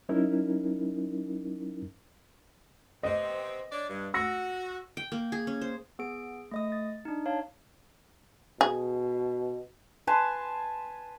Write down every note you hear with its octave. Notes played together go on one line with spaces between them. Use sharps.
F#3 C#4 D#4 E4 A#4
C3 B3 C4 D#5
D4 C#5 D5
G2
F#4 E6 A#6 C#7
G5
A#3
G#4
C#4
C5
B3 G#4 D7
A3 D#5 D#6
A6
D4 D#4
C#5 F5 A5
B2 G#4
B4 G#5 A5 C6